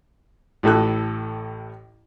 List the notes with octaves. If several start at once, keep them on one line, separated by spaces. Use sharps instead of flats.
A1 A2 A4 F#6